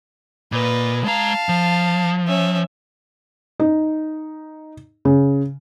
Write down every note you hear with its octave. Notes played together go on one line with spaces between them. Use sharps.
A#2 B4 D#5
G#3 F5 A5 A#5
F3
C#4 E5
D#4
C#3